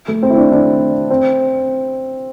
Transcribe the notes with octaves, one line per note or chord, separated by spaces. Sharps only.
A3
C4
E4
D4
D4
C4